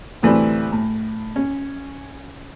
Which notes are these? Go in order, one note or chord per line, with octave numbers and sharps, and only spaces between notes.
D2 A2 E3 G3 A3 C4
A2
C#4